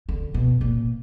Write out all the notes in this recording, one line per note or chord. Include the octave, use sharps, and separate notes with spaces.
D3
B2
A#2